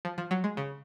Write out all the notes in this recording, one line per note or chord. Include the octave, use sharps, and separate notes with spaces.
F3
F3
F#3
G#3
C#3